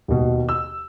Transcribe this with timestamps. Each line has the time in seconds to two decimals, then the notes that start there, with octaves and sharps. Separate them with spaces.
0.08 D#2 B2
0.49 E6